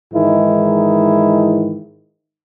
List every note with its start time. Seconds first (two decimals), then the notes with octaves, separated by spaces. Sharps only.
0.14 G#2 D#3 E3 G#3 D#4 E4